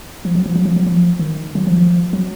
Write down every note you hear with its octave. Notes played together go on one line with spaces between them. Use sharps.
F3
F#3
F3
F#3
F3
F#3
F3
D#3
F#3
F3
F#3